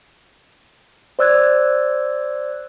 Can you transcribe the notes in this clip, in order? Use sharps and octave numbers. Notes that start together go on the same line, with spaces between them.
C5 D5 E6 F#6 G#6